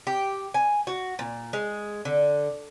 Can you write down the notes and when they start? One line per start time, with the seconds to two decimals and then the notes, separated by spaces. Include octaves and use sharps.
0.07 G4
0.54 G#5
0.87 F#4
1.19 A#2
1.53 G#3
2.05 D3